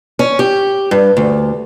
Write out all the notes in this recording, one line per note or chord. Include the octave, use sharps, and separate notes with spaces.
C#4
G4
G2
D2